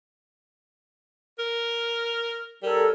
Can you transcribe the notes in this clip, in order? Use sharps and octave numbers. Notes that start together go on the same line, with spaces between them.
A#4
G3 A4 A#4 C#5